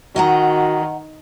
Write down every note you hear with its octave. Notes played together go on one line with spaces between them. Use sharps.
D#3 F#4 D#5 F#5 A#5